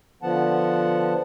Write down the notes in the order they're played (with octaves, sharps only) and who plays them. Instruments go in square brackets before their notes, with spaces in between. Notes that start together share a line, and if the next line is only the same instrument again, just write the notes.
[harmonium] D3 F3 B3 F#5 A5